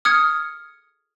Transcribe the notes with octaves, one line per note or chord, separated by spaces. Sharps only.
D#6 F6 G#6 C#7